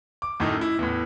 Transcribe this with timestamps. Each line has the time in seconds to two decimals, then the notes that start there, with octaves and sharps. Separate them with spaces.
0.22 D6
0.40 F#2 A2 A3 D#4
0.61 E4
0.79 E2 A2